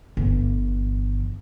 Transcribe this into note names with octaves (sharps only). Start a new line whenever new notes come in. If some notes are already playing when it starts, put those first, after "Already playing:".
G1 E3